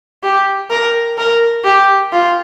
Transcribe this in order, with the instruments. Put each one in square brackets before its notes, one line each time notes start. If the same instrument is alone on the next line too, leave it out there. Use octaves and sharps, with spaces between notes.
[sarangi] G4
A#4
A#4
G4
F4